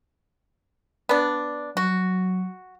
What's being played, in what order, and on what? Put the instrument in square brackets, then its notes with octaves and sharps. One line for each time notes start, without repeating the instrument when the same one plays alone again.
[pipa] B3 D4
[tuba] F#3 [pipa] F#4